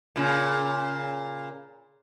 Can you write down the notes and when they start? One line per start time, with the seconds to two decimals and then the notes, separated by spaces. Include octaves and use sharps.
0.16 A#2 C#3